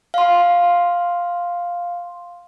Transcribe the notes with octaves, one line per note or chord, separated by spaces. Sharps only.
F5 C6